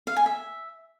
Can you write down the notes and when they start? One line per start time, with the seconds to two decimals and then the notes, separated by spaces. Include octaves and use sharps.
0.07 F5
0.16 G#5
0.26 E5